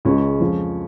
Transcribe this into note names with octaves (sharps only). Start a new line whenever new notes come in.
C#2 C#3 G#3 C#4
F2 F3 G#3